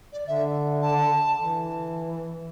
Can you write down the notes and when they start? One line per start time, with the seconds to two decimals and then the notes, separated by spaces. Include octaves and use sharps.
0.12 D5
0.27 D3 E5
0.82 A5
1.35 E3